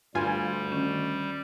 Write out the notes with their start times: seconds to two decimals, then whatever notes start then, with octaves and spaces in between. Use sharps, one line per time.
0.15 D2 G2 G3 F4 G#5
0.71 D#3 C#4